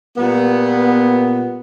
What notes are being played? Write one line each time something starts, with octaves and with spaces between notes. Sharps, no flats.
A#2 G3 B3